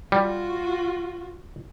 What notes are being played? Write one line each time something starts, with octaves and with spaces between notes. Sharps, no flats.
G3 F4 F#4